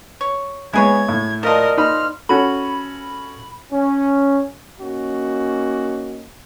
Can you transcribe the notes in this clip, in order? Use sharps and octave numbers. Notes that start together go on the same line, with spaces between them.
C#5
G#3 B3 E4 G#4 C#5 G#6
A2
F3 F4 A#4 D5 D#5 A5
D#4 C5 B5 F6
C#4 F#4 A4 B5
C#4
A#3 C#4 D#4 F#4